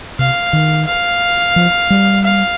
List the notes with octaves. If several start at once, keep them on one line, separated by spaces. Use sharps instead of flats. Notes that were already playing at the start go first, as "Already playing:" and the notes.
C3 F5
D#3
F5
F3
G3
F5